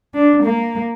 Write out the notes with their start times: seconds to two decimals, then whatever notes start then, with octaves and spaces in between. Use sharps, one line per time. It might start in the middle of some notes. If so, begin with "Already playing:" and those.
0.14 D4
0.44 A#3